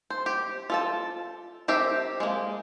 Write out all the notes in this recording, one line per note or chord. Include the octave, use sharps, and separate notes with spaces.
C5
G4
F4 A4 A5
C4 G4 A#4 E5
G#3 A#3